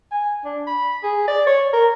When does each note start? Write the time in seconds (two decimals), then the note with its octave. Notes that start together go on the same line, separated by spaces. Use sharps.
0.12 G#5
0.45 D4
0.67 B5
1.03 G#4
1.28 D5
1.47 C#5
1.73 A#4